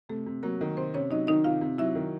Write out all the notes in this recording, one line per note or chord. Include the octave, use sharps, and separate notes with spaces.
C3 A3 A4
C3
F#3 A#3 A#4
D#3
C3 C4 C5
C3 C#4 C#5
F#3 D#4 D#5
D#3 D#4 D#5
C3 F4 F5
C3
F#3 E4 E5
D#3